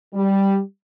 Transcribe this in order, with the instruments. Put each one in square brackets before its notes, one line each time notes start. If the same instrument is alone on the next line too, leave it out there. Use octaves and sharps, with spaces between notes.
[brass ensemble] G3